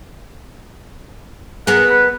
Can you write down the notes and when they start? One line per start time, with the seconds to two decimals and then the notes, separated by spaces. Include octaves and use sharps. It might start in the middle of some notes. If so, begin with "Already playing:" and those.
1.67 B3 G#4 A#4 F#5
1.90 B4